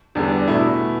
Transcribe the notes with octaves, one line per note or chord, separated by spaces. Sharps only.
E2 D3 G3 D4
B2 A3 E4